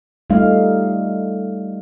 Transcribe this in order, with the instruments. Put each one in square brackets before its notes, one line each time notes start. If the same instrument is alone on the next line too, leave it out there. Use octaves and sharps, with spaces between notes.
[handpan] G3 A3 D#4 F5